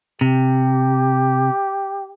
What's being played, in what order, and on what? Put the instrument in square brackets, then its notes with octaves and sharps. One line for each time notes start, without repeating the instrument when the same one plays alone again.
[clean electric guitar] C3 [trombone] G4